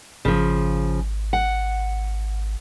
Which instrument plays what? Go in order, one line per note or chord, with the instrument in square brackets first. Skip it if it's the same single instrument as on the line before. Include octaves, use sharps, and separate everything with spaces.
[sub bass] G#1 [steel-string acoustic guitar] C#3 F3
[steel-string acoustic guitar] F#5